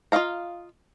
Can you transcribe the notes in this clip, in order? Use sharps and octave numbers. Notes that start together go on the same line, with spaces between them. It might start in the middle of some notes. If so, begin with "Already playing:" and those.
F4 A#4 D#5 F5 A#5